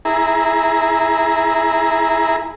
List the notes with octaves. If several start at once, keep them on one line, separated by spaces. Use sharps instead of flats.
E4 G#4 A#5